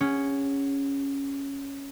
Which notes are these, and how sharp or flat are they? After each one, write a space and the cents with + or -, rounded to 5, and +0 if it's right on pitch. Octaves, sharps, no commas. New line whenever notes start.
C#4 +0 G#4 -30 F#5 +0